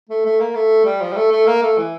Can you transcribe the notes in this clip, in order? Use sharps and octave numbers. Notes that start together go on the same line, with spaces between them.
A3
A3
A#3
A3
G3
F3
G3
A3
A3
A#3
A3
E3